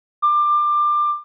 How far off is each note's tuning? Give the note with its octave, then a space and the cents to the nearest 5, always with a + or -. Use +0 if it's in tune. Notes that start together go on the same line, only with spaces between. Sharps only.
D6 +20